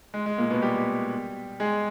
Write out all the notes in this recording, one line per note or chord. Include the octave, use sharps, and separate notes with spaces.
G#3
G#3
A#2 A#3
B2 B3
G3 G4
G#3 G#4